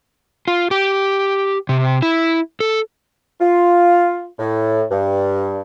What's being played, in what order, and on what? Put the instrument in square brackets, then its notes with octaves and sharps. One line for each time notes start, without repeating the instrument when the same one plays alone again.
[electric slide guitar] F4
G4
C3
E4
A4
[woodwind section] F4
A2
G2